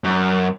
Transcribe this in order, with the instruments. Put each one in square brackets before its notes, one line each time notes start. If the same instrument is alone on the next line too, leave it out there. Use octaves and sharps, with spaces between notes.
[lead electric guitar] F#2